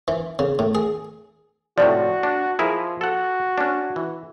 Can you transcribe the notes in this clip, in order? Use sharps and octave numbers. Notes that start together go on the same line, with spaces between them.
E3
C#3
A2
G#4
A2 C3 F3 F#4 D5
D4
F3 E4 G#4 A#4
F#4 A4 F#5
C#4 D4
E3